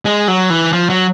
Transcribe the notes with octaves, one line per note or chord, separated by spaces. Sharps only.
G#3
F#3
E3
F3
F#3